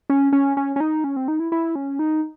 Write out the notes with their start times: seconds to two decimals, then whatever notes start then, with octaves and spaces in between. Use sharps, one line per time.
0.10 C#4
0.33 C#4
0.57 C#4
0.76 C#4
0.80 D#4
1.04 C#4
1.16 C4
1.28 D#4
1.40 E4
1.52 E4
1.75 C#4
1.99 D#4